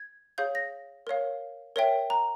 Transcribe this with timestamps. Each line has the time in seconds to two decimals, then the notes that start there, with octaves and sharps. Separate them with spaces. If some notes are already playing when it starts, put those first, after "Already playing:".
Already playing: G#6
0.38 G#4 C#5 F5 G6
0.55 A#6
1.07 A#4 C#5 F5
1.76 A#4 C#5 E5 G5
2.10 A#5